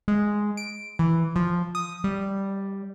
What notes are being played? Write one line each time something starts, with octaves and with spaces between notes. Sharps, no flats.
G#3
D7
E3
F3
D#6
G3